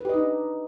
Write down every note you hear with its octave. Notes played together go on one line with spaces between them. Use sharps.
D4 D#4 G4 B4 D#5